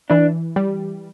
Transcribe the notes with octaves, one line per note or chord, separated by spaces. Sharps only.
E3 D4
G3